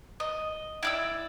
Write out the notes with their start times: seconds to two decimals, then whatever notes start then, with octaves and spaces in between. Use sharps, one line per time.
0.20 D#5
0.83 E4 D5 E6